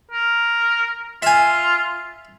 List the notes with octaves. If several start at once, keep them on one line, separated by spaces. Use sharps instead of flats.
A#4
F4 E5 G#5